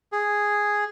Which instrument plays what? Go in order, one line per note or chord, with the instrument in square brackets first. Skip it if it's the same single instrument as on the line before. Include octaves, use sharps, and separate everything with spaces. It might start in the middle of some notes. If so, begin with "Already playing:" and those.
[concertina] G#4